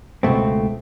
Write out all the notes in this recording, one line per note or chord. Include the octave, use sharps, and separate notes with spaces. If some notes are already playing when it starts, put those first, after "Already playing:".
C#2 F#2 B2 A3 C4